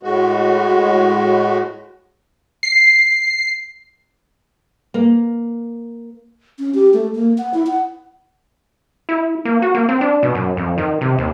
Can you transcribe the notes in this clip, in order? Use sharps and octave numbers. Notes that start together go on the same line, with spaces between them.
A2 G#3 F#4
C7
A#3
C#4
G4
A3
A#3
F#5
E4
F#5
E4
A#3
F#4
A#3
C4
D4
B2
F#2
F2
D#3
C3
D#2